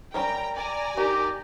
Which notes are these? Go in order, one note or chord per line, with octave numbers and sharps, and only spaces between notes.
G3 C#4 A#4 G5 A#5
D5 G#5 A#5
D#3 G4